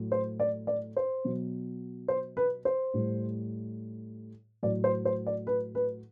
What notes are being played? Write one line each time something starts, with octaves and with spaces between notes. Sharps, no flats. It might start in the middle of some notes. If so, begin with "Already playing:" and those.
Already playing: A2 F#3
C5
D5
D5
C5
B2 F#3
C5
B4
C5
A2 G3
A2 F#3 D5
C5
C5
D5
B4
B4